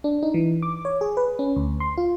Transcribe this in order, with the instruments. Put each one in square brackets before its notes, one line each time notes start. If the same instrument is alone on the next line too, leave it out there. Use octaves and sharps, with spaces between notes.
[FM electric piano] D4
D#4
E3
D6
C#5
G#4
B4
C#4
D2
C6
F4